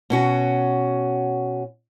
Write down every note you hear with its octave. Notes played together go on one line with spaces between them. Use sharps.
B2 C#4 F#4